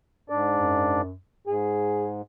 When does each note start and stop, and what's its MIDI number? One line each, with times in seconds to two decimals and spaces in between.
0.30 1.01 44
0.30 1.01 62
0.30 1.01 74
0.56 1.15 42
1.47 2.22 44
1.47 2.09 68